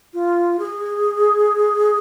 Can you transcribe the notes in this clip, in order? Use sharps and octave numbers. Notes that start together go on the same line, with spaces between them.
F4
G#4